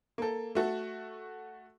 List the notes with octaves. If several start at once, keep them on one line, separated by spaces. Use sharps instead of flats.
A#3 A4
A3 F#4 A4